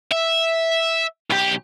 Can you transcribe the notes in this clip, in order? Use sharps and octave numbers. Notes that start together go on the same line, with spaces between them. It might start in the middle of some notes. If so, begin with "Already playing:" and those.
E5
B1 G4